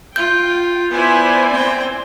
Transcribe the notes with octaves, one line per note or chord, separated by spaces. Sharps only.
F4 G5 G6
B3 E4 C5 D5 G#5
C4 G5